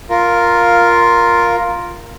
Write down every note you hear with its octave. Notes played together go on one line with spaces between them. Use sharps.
F4 A#4